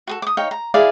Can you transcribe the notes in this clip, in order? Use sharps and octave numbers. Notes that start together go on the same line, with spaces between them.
F#4 G#4 A4
D6 D#6
D#4 C#5 F5 G5
A#5
E4 G#4 D5 F5